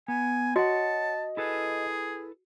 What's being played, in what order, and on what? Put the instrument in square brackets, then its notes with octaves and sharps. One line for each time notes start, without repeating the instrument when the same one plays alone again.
[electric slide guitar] B3 [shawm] G#5
[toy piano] F#4 [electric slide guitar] C#5 F#5 [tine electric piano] D#5 [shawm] A5
[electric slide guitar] E4 A4 B4 [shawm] G#4